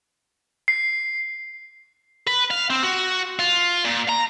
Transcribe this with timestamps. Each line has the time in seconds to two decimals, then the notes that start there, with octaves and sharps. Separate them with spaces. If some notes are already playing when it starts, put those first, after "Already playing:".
0.68 C7
2.27 B4
2.51 F5
2.70 C4
2.83 F#4
3.39 F4
3.85 A#2
4.09 A#5